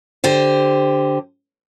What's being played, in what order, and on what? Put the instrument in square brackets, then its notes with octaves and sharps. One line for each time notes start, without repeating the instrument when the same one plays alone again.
[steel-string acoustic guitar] D3 G4 C5